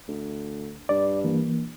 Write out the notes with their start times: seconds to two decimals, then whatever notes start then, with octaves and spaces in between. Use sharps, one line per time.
0.08 D2
0.89 G2 D5
1.24 E3 A#3